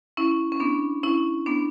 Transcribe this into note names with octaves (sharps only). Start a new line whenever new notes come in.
C#4 E4
C#4
B3 D4
C#4 E4
B3 D4